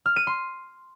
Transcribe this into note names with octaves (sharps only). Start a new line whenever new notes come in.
F6
D#7
C6